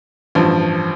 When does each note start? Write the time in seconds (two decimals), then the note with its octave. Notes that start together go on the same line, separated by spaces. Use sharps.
0.35 A1 G2 F3